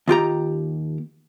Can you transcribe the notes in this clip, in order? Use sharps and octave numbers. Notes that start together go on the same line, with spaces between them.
D#2 F4 G4 A#5